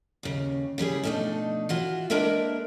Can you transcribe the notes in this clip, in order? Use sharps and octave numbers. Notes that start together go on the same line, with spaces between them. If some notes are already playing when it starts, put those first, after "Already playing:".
D#2 C#3
C#3 E3 G3 G#4
B2 F3 A3 D4 D#4
E3 F4 F#4
G#3 A#3 D4 A#4 B4 E5